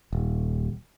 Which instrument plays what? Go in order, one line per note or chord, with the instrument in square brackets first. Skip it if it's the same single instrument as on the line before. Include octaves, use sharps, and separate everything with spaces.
[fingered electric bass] D#1